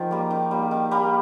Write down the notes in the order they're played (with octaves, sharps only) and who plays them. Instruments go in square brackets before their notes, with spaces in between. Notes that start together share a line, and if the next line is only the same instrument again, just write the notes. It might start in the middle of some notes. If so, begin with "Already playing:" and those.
Already playing: [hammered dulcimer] D#3 [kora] F3
[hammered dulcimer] G3 A#3
D#3
G3 A#3
D#3
G3 A#3